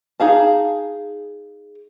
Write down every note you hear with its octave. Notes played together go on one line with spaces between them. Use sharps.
D#4 G#4 F5 A5